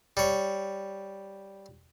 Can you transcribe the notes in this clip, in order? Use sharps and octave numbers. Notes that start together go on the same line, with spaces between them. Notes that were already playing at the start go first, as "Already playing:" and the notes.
G3 C#5